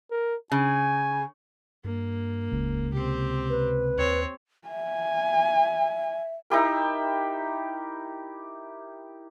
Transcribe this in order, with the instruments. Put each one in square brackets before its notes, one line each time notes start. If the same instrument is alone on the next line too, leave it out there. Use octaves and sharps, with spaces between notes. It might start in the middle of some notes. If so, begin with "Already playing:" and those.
[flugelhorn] A#4
[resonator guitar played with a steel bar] C#3 [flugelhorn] G#5
[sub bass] G2 [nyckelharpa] A#3
[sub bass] D#1 [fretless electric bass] C#2
[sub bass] C3 [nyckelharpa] C4 G4
[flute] B4
[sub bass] D#2 [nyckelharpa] C4 C#5
[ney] E5 [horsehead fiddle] G#5
[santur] D#4 E4 G4 A#4